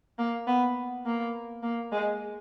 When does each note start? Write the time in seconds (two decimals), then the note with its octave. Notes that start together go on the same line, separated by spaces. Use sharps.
0.18 A#3
0.47 B3
1.06 A#3
1.63 A#3
1.92 G#3